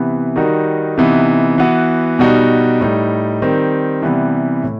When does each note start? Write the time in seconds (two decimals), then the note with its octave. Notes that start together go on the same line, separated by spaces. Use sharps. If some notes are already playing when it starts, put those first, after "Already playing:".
Already playing: C3 E3 B3
0.36 D#3 G3 D#4 F#4
0.97 C3 E3 B3 D#4
1.58 E3 B3 F#4
2.19 B2 G3 D#4 F#4
2.81 A2 G3 D#4
3.42 D#3 G3 C4
4.02 C3 E3 G3 B3
4.63 A2